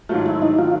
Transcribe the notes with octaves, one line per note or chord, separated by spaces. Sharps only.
G#2 D#3 F#3 A3 F4
E4
D#4
D#3 F#3 A3 F4